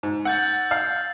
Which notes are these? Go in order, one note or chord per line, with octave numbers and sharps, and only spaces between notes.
G#2
F#5 E6 G6 A6
F5